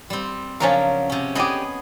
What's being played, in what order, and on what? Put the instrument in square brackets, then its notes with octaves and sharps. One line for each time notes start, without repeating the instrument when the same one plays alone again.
[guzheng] G3 C4
[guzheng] C#3 F3 F#3 [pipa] C#4 D4 A#4
[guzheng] C3 C#4
[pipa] D3 G4 [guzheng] B3 G#4 D#5